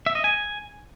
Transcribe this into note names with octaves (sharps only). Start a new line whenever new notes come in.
E5
D#5
G#5